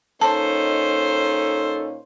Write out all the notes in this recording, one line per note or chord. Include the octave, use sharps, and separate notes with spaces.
A#2 C#4 D#4 A4 C5 A5